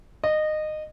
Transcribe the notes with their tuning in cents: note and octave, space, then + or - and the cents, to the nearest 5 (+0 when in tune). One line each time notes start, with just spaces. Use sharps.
D#5 -20